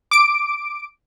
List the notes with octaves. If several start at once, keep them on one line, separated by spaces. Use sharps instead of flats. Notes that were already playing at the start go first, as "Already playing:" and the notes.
D6 D7